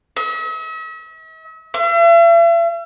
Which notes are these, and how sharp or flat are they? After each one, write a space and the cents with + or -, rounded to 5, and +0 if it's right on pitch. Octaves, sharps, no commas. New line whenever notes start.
E5 -45
E5 +45